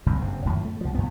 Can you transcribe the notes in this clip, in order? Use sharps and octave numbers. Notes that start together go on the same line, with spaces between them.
F#1 C2 G2
F#1 G2 C3
F#2 A2 D#3 F3
A3
C2 F3
F2 B3